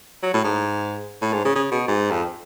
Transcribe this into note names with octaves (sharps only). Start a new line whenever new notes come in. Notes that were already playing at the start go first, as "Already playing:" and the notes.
F#3
A2
G#2
A2
G#2
C#3
C#3
B2
G#2
F2